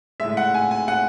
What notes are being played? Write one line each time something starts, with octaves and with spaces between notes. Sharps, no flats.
A2 G#3 E5
F#5
G#5
G#5
F#5